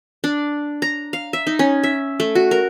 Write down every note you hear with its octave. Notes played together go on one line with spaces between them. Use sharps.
D4
A#5
F5
E5
D#4
C#4
E5
A3
F#4
A#4